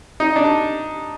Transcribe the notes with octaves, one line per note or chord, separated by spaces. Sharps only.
D#4
D4